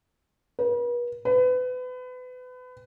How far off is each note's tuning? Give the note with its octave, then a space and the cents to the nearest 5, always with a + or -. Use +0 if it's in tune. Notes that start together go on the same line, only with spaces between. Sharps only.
B4 -40
B4 +30